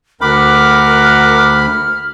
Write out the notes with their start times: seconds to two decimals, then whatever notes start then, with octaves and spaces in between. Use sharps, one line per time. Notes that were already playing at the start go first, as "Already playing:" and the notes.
0.21 D2 A#4 F#5 B5 D6 F6